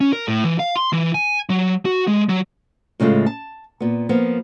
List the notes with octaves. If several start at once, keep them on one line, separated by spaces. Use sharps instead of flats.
C#4
A#4
A2
E3
F5
C6
E3
G#5
F#3
F#4
G#3
F#3
A2 C#3 G#3 A3 F4
A5
A#2 B3
F3 A#3 B3